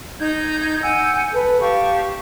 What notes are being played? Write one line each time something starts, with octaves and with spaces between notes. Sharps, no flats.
D#4 G6 G#6
F#5 G#5 E6 G6
A4 B4
G4 F5 A5 C#6